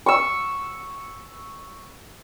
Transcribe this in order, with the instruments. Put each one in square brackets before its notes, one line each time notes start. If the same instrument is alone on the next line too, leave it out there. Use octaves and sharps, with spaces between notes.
[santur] C#6 E6